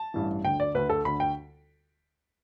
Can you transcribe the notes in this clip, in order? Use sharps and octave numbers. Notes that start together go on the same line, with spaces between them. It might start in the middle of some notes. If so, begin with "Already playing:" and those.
Already playing: A5
A1 G2 E3
D2 D3 G5
D5
D2 D3 B4
A4
D2 D3 B5
G5